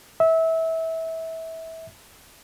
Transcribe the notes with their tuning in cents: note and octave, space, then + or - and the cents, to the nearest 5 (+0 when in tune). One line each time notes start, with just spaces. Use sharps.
E5 -25